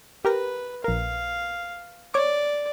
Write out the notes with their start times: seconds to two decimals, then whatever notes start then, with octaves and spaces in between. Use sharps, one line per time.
0.25 G4 A#4 B4 A#5
0.84 A#1 A#4 F5
2.14 C#5 D5 D6